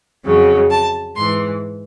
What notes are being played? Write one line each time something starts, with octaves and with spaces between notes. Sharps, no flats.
F2 C#3 F#3
A5
G#2 E3 C6